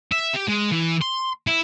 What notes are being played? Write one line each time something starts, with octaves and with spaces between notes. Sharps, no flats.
E5
G4
G#3
E3
C6
E4